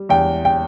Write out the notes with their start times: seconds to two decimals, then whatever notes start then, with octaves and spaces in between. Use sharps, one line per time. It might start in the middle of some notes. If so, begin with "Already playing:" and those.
Already playing: G3
0.09 E2 G5
0.45 G5